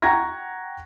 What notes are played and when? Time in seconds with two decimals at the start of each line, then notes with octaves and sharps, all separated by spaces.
0.02 F#5 G5 A#5 C#6 G#6 A#6